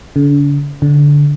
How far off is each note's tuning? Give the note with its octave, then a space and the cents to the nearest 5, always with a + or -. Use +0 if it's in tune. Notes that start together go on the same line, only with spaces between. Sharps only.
D3 -45
D3 -15